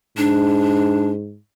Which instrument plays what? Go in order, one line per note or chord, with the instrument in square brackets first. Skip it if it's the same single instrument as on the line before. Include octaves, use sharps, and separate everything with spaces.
[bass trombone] G#2 [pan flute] D4